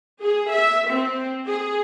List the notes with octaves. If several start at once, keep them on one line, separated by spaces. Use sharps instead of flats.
G#4
E5
C4
G#4